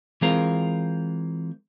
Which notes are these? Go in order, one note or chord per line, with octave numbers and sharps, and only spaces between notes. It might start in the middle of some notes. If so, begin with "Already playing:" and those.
E3 G#3 C4 F4 A#4